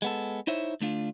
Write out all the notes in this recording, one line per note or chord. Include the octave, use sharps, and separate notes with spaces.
G#3 B3 A4
D#4 E4 C5 C#5 E5
D2 A3 D4 F4